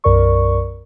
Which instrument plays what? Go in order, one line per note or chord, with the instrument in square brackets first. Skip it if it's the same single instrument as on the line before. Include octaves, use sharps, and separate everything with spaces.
[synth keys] B1 F#2 A#4 D5 C#6